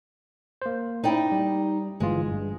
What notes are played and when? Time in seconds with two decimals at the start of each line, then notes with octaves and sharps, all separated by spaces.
0.62 A#3 C5
1.04 C#4 D#4 E4 D5 G5
1.32 G3
2.00 G1 E3 G#3 F4
2.31 G2